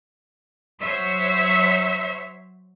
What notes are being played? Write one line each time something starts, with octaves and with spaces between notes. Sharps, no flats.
F#3 C5 C#5 E5